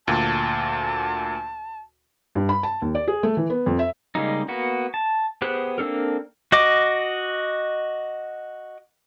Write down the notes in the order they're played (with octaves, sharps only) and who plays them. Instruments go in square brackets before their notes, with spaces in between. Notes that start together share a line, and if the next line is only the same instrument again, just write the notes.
[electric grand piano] D2 A#2 [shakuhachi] A5
[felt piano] G2
B5
A5
D#2
D5
G#4
A3
E3
B3
F2
E5
[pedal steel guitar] C#3 G3 G#3 A#3 D#4
A#3 B3 F#4
A5
B3 G4 G#4 C5 F#6
A#3 C4 D4 A4 A#4
F#4 D#5 D6